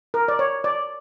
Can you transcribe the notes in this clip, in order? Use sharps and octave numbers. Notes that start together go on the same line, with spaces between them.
A#4
D5
C#5
D5